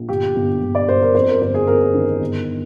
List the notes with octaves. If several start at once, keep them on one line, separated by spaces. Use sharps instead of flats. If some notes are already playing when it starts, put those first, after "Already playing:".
Already playing: A#1
G1 G4
G1
G1
D5
G2 C5
A#4
F2 C5
A#4
G1 C5
G#4
F2 A#4
D#3
G1